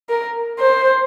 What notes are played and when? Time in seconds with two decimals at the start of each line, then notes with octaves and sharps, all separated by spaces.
0.09 A#4
0.59 C5